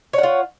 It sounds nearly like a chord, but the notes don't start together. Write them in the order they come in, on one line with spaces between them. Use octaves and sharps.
C#5 F#5 F4